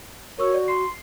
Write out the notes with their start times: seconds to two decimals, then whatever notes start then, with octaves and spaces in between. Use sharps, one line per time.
0.39 F#4 A#4 C#5 C#6 E6
0.54 D5
0.68 C6 C7